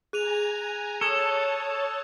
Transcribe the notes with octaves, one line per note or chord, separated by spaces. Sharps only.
G#4 G#5 A#5 F#6 D#7 F7
A4 C#5 A5 C#6 D#6 G#6